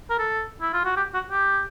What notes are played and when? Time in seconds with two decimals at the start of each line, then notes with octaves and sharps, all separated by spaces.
0.10 A#4
0.19 A4
0.62 E4
0.73 F4
0.85 F#4
0.97 G4
1.14 F#4
1.31 G4